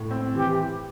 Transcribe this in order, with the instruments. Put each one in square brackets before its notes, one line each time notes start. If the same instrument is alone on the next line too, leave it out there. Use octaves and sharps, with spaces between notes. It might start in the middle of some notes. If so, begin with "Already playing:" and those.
Already playing: [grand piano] A2
C4
[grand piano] E3 [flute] G4